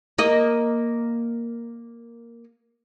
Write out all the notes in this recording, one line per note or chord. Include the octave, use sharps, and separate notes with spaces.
A#3 D#5